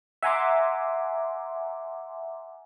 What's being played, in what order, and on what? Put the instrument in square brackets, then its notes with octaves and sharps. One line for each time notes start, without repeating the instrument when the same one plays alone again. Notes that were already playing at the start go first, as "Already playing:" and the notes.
[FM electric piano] E5 F#5 G#5 A#5 C6 D6